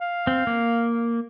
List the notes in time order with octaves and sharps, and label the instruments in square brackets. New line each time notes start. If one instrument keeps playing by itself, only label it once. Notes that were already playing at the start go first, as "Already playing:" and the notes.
[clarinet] F5
[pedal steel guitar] C4
A#3